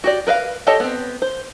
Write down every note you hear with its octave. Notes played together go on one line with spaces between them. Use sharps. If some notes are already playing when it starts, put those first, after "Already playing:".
F#4 G4 D5
A#4 B4 E5 F5
G4 A4 C#5 D#5 A5
B3 C4
C5